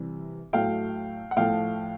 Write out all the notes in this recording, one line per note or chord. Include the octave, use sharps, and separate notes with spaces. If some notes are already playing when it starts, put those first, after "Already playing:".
Already playing: C3 E3 G3
A2 F#3 A3 F5 G5
F#5
A2 F3 A3 F5 G5